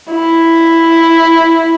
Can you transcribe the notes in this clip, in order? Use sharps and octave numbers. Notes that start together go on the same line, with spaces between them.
E4